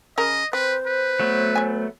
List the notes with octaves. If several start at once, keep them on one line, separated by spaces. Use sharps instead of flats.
C#3 A#4 D#5
C4 B4 C5
B4
F#3 A3 B3
E5 G#5